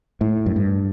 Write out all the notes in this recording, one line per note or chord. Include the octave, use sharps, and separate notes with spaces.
A2
F#2
G2